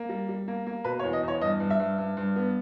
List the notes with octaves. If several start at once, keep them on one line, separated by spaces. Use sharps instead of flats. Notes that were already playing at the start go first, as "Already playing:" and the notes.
Already playing: A#3
G3
G3
A#3
A#3
B2 B4
C#5
E2
D#5
E2
C#5
G2 D#5
G2
E5
G2
G2
G2
B3